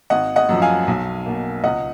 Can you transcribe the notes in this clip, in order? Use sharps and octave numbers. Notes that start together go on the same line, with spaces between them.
G#1 D#5 F#5
D#5 F#5
F#2 F3
F5 G#5
B1
B2 A#3
C#2 D#5 F#5